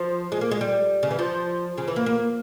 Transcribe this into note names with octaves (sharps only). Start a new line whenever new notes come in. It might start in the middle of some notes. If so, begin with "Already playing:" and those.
Already playing: F3
G#3
A#3
G#3
G3
C#3
E3
F3
C#3
E3
A#3
A#3